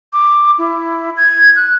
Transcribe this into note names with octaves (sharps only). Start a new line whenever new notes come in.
D6
E4
G#6
F#6